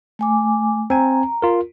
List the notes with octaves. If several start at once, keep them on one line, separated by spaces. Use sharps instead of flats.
A3 G#5 D6
C4 G#5 A#5
F4 A#4